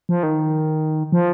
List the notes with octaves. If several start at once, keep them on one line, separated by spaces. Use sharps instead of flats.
F3
D#3
F3